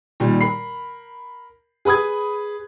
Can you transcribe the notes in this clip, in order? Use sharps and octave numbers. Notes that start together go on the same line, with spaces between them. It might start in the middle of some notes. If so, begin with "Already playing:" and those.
A#2 D#3 G3
A#4 B5 C7
G#4 B4 B5 D#6 G#6